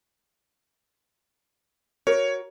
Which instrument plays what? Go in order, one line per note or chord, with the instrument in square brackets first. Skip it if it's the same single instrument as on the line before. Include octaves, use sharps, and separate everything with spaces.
[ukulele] F#4 A#4 [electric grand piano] C#5